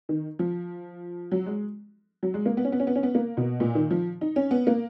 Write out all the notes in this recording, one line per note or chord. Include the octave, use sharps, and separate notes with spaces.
D#3
F3
F#3
G#3
F#3
G#3
A#3
B3
C#4
B3
C#4
B3
C#4
B3
A#3
B2
A#2
D#3
F3
D#4
C#4
B3
A#3